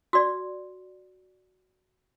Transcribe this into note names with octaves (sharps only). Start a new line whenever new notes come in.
F#4 D5